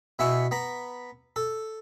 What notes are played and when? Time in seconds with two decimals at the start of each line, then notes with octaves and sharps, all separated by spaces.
0.19 B2 B3 E4 E5 G#5 C#6
0.51 B3 A#5 B5
1.36 A4